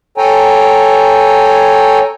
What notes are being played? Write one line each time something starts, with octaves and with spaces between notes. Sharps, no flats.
A4 C#5 G5 G#5 A#5